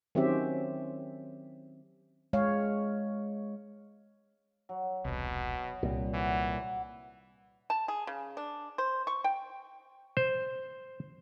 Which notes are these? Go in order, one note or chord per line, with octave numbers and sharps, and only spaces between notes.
D#3 F#3 C4 C#4 G4 E5
G#3 C#5 F5
F#3
E1 C2 B2
C2 A#2 G3
E3 F#4 D6
A5
G#4
C#3
D4
C5
C#6
G5
C5